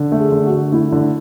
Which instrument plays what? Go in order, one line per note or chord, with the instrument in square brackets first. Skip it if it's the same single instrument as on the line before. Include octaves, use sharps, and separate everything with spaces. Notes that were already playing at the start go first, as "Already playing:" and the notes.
Already playing: [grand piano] D3
A3
[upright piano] G#4
[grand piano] D3
[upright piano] F#4
[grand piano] D3
[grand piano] A3 [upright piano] E4
[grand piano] D3